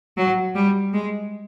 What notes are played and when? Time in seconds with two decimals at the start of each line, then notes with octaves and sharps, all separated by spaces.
0.17 F#3
0.55 G3
0.93 G#3